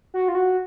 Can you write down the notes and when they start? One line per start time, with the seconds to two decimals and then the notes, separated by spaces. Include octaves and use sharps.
0.14 F#4
0.28 F4
0.35 F#4